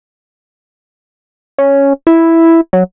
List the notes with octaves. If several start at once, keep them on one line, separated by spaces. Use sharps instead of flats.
C#4
E4
F#3